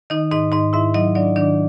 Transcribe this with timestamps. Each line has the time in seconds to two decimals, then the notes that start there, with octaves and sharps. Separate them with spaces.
0.10 D#3 D#4 D#5
0.31 G#2 D#4 D#5
0.52 G#2 D#4 D#5
0.73 G#2 E4 E5
0.94 F#3 D#4 D#5
1.15 F#3 D4 D5
1.36 D#3 D4 D5